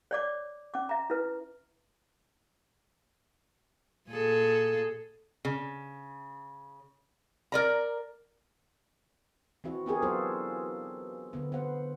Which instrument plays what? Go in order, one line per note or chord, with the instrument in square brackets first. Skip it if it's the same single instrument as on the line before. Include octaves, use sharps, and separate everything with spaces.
[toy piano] C#5 D5 D6
C#4 D6
E5 A#5
E4 B4
[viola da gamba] A#2 G#4 A4
[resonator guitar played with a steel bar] C#3
A#4 D5 A#5
[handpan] E3 C4 E4 F#4
B3 C4 D4 G4 G#4 A#4
F#3 B3 D4 F4 A4 C5
D3 B3
B3 C5 F#5